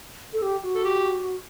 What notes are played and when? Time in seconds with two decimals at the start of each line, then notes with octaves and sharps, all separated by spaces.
0.33 A4
0.42 G4
0.64 F#4
0.75 A4
0.84 G4